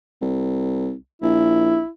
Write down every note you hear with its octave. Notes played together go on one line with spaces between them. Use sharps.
C2
A#1 E4